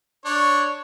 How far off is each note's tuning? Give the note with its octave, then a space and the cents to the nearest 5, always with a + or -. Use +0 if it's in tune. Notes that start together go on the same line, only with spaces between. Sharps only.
D4 +0 C#5 +0